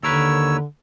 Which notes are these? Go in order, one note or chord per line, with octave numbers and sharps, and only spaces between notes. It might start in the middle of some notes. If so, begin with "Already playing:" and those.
D#2 D3 A#4 B4 C#5 E6